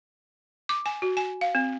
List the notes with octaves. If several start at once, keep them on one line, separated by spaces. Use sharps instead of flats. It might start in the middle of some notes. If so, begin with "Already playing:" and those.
D6
G#5
F#4
G#5
F5
C4